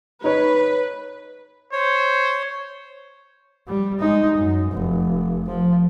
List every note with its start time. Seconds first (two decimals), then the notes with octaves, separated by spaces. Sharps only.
0.24 D#4 B4 C#5
1.73 C5 C#5
3.68 G3
4.00 G#3 D#4
4.37 F#2
4.72 F1
5.47 F3